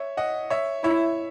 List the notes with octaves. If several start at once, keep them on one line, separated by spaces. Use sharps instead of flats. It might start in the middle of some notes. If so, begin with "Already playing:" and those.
Already playing: C#5 E5
D#5 F#5
C#5 E5
E4 C#5 E5